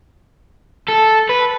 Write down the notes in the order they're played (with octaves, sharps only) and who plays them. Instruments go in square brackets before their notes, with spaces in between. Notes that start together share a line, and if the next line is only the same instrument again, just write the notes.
[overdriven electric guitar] A4
B4